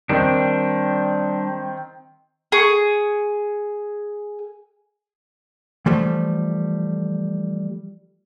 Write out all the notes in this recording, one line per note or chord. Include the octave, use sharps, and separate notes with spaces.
D#3 G3 C4 D4
G#4 C#6
E3 F3 G3 A3